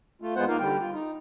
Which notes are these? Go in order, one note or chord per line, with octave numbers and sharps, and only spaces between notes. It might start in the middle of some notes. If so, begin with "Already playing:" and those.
A3 F4
E2 G#3 B3 F4 C5 F#5
A#3 D#4 F4 A#4 F5
D3 G3 G5
F4
D#4